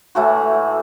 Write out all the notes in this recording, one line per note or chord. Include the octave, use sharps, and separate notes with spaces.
A2 E3 A3 F#4